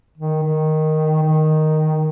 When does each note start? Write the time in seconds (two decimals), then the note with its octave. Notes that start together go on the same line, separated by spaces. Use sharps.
0.17 D#3
0.43 D#3
1.22 D#3